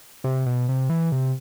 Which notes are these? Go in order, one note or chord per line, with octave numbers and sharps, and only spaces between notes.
C3
B2
C3
E3
C3